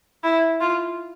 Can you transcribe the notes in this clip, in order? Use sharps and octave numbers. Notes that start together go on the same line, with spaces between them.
E4
F4